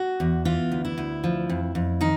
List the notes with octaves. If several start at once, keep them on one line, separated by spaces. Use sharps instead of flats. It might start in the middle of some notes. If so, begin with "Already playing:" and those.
Already playing: F#4
E2
E3 F4
D2
E4
D2
F3
F2
F2
D#3 D#4